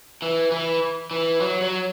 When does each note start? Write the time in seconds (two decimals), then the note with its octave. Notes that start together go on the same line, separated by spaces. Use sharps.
0.22 E3
0.51 E3
1.11 E3
1.41 F#3
1.61 F#3